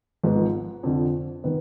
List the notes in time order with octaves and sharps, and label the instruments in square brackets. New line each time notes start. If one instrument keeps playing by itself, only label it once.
[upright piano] G#1 G#2 F3 B3
F2 D3 F3
D#3 B3